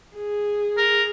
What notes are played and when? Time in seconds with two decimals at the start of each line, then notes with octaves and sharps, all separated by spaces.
0.16 G#4
0.77 A#4